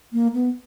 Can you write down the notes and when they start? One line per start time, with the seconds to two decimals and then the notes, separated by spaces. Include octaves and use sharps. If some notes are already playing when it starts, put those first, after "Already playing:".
0.13 A#3
0.34 B3